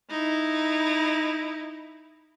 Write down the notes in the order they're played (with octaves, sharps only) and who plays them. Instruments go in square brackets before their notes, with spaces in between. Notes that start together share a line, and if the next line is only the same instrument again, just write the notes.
[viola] D#4 E4